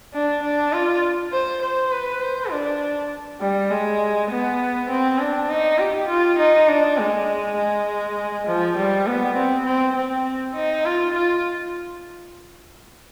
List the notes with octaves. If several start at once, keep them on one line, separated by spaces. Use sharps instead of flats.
D4
D4
F4
C5
C5
B4
C5
D4
G3
G#3
B3
C4
D4
D#4
G4
F4
D#4
D4
G#3
G#3
F3
G3
B3
C4
C4
C4
D#4
F4
F4